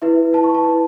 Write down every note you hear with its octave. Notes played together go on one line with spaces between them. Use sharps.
E4 B4 E5
E4 B4 A5
C#6
B5
A5
E4 B4